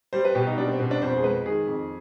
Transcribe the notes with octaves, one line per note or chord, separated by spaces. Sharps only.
G3 C5
B4
B2 G4
D#4
G3 D4
C4
B2 C4
D4
F2 C5
G#4
G#3 B4
D#3 G#4
F2